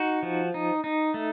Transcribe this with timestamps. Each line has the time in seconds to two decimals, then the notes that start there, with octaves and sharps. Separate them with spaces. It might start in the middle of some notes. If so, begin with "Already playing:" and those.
Already playing: D#4 F#4
0.23 F3
0.54 D#4
0.84 D#4
1.14 A3